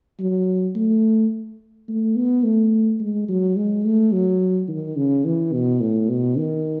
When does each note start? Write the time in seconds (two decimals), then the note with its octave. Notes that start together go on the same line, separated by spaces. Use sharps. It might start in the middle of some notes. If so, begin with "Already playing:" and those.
0.19 F#3
0.76 A3
1.88 A3
2.16 B3
2.44 A3
3.00 G#3
3.29 F#3
3.56 G#3
3.85 A3
4.12 F#3
4.68 D#3
4.97 C#3
5.25 E3
5.53 B2
5.81 A2
6.09 B2
6.37 D#3